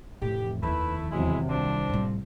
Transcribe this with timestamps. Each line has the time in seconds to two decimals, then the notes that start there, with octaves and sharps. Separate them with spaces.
0.22 F1 A2 E3 G4
0.63 D#2 D#3 A3 E4 B4
1.11 E2 C3 F#3 G#3 E4
1.49 C2 F3 C4 D4
1.90 A2 G3